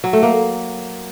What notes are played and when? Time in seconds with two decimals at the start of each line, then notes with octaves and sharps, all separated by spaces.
0.04 F#3
0.13 A3
0.23 A#3